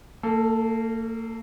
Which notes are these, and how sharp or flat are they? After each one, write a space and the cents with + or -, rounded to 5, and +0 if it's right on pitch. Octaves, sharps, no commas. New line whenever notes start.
A#3 -40 A4 +0